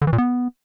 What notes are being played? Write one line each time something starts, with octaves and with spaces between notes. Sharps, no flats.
D3
E3
A#2
B3